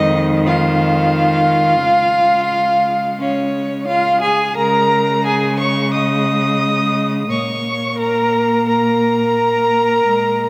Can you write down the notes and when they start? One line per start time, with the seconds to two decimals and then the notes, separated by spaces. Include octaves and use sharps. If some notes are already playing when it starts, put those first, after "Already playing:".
Already playing: F2 D#3 G#3 D#4 D#5
0.45 F4 F5
1.82 C#3 G#3
3.19 C#4 C#5
3.87 F4 F5
4.22 G#4 G#5
4.56 C#3 G#3 A#4 A#5
5.25 G#4 G#5
5.59 C#5 C#6
5.93 D#5 D#6
7.30 A#2 A#3 C#5 C#6
7.99 A#4 A#5
8.67 A#4 A#5
10.04 A#2 G#3